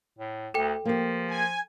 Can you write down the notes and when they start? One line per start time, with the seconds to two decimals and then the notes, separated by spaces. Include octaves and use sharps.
0.19 A2
0.54 D2 A4 G5
0.85 F3 A#3 G4
1.30 G#5